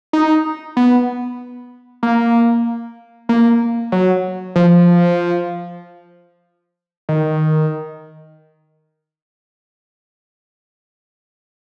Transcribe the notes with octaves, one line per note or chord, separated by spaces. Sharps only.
D#4
B3
A#3
A#3
F#3
F3
D#3